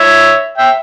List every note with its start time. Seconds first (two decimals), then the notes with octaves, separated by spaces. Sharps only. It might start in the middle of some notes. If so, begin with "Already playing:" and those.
Already playing: C#5 E5
0.58 E5 G5